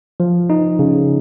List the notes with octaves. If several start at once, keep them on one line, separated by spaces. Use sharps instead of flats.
F3
D#4
C#3